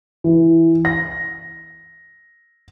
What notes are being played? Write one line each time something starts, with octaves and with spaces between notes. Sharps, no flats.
E3
A#6